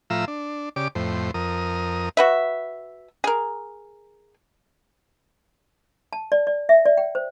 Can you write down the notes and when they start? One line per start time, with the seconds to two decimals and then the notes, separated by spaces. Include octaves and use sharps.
0.10 A2 F3 F4 E5 A#5 E6
0.28 D4
0.76 C#3 G4 D5 D6
0.95 F2 A2 C5
1.34 F2 A#4 D#6
2.17 F#4 B4 E5
3.24 G#4 A#4
6.13 A5
6.32 D5
6.47 D5
6.69 E5
6.86 D5
6.97 G5
7.15 C5